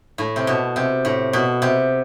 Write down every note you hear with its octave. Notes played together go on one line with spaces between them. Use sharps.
A2
C3
B2
C3
A2
B2
C3